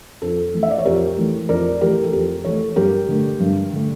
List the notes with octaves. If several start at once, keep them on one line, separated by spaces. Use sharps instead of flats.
F2 A4
E3 A3
E5
D5
C#5
F2 G4 A#4
E3 A3
F2 A#4 D5
E3 A3 G4 A#4
A4
F2 G4 A#4
E3 A3 A4 C#5
G2 G4 A#4
D3 A3
G2
D3 A3